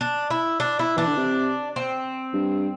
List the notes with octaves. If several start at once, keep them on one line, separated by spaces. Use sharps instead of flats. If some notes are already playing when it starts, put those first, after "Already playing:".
D4
E4
D4
E4
E3 D4
D3
C3
C4
G2